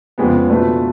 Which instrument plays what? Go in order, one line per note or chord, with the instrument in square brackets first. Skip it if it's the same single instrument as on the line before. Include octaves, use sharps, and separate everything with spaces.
[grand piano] F2 C#3 G#3 B3
B2 A3 D4 F4 B4